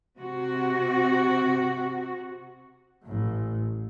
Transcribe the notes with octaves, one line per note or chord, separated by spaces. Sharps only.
C3 F#4
A1 A2